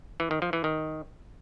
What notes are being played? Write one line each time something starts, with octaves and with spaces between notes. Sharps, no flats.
E3
D#3
F3
E3
D#3